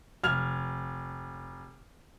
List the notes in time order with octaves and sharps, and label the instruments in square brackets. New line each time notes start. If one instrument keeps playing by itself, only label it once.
[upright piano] F1 F6 G#6 F7